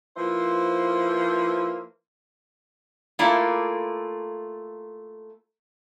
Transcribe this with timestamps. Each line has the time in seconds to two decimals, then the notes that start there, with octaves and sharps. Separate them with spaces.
0.17 F3 A#3 E4 B4 C5
3.19 A3 A#3 E4 F4 A4 D5